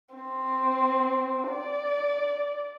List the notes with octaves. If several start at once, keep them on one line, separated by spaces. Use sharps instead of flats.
C4
D5